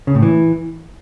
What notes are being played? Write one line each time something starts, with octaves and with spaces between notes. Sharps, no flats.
C#3
A2
E3